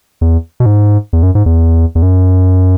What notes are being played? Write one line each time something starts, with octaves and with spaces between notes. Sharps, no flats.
E2
B2
G#2
E2
F#2
G#2
E2
E2
F#2